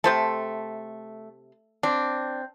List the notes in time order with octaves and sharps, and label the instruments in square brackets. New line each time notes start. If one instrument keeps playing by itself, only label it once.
[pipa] C3 C5 A5 [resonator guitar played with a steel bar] A3
[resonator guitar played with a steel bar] C4 [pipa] D4